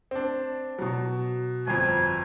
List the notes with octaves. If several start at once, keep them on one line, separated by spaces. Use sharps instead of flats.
C4 D4
B2 F#3
G1 F2 G#5